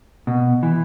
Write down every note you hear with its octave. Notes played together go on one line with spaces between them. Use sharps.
B2
E3